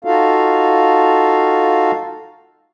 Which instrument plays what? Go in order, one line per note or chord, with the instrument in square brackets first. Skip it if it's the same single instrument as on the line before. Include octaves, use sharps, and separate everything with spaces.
[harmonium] D#4 F4 F#4 A4 F5